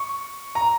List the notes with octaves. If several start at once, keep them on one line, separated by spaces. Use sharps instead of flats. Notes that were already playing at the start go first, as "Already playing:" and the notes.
Already playing: C#6
A#5